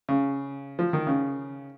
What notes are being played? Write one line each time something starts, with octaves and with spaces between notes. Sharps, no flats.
C#3
F3
D#3
C#3